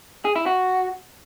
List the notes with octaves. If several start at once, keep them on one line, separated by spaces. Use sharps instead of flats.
G#4
E4
F#4